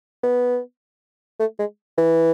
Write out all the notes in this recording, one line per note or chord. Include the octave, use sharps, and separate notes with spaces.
B3
A3
G#3
E3